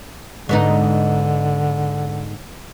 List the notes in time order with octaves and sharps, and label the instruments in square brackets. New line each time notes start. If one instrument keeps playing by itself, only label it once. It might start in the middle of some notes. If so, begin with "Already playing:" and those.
[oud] G#2 B3 D#4 [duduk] D3